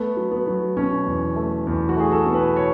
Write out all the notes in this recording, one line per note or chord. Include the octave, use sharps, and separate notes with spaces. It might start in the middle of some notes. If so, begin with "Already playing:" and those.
Already playing: A3 B3
F#3
B3
F#3
B2 C#4
E2
A3
E2
F#4
A3 G#4
A4
B2
B4
C#5